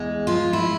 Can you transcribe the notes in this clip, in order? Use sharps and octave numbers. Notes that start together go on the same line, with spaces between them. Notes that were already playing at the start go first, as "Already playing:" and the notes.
Already playing: E2 G#3
F3 F4
E4